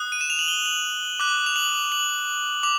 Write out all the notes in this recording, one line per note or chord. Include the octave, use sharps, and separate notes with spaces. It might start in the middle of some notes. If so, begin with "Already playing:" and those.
Already playing: D#6 F#6
D#7
E7
F7
F#7
G7
F#7
D6 F#6
F7
F#7
F#7
D6 F7